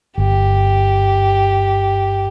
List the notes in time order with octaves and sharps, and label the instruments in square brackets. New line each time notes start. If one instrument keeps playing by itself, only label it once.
[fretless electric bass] G1 [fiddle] G4